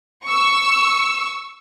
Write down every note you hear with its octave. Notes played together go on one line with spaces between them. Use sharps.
C#6 E6